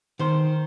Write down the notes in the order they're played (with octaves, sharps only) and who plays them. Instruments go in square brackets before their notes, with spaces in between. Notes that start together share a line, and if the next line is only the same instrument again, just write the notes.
[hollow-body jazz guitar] D#3 C5